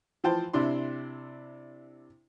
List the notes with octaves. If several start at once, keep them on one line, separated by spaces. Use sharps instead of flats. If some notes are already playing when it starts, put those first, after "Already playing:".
E3 F3 C5 G5 A5
C3 D4 E4 C6